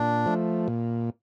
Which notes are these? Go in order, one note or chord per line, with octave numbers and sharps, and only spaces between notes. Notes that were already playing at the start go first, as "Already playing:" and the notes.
Already playing: A#2 D4
F3 A3
A#2